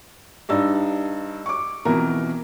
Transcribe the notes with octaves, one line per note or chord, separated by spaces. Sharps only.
G2 D4 D#4 E6
C#6 D6
F2 B2 E3 A#4